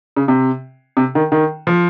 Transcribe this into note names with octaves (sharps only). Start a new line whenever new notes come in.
C#3
C3
C3
D#3
D#3
F3